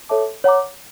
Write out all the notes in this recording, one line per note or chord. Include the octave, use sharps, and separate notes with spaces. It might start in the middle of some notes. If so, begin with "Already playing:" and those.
A4 C#5 E5 A5 D6
C#5 F#5 A#5 D6